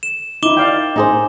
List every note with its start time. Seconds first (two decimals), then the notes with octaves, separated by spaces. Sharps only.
0.03 E7
0.43 D#4 E4 D6 E7 G7
0.57 D5 F5 G5
0.96 D#4 G#4 C5